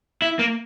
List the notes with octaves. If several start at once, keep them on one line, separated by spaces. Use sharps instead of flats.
E4
A#3